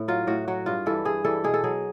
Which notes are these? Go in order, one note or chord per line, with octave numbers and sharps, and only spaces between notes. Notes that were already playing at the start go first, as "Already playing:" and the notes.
Already playing: A2
F#3 F4
A2 F#4
F#3 F#4
G2 F4
E3 G3 A4
G2 G#4
E3 G3 A4
B2 G#4
A4
F#3 G#4